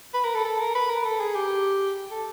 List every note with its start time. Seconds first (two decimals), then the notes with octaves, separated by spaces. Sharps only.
0.14 B4
0.24 A#4
0.35 A4
0.45 A4
0.60 A#4
0.75 B4
0.90 A#4
1.05 A4
1.20 G#4
1.36 G4
2.11 A4